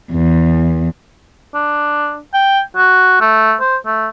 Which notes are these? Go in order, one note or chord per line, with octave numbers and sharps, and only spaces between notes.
E2
D4
G5
F#4
A3
C5
A3